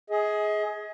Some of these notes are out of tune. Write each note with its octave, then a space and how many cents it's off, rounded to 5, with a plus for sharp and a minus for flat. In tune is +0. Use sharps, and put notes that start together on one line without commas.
G#4 +10 D#5 +40